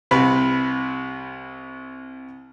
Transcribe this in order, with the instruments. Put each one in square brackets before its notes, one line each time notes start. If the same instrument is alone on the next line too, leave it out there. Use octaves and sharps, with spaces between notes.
[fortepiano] C2 C3 B4 B5